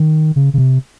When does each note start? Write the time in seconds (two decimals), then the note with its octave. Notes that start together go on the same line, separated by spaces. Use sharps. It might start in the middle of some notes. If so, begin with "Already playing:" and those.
Already playing: D#3
0.36 C#3
0.54 C#3
0.58 C3